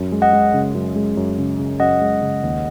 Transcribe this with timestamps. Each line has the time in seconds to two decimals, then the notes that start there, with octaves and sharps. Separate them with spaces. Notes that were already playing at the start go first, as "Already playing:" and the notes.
Already playing: F#2
0.12 G#3
0.22 D#5 F#5
0.33 G#3
0.54 C#3
0.75 F#2
0.96 G#3
1.17 F#2
1.38 C#3
1.59 C#3
1.80 F#2 D#5 F#5
2.02 G#3
2.22 C#3
2.43 D#2